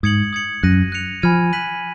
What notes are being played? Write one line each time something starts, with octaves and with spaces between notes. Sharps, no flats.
G#2 D#6 G#6 C#7 F#7
D#6 G#6 C#7 F#7
F#2 F#6 A#6 D#7
F#6 C#7 F7
F3 G#5 B5 F6 G#6 D#7
F#6 B6 D#7 F#7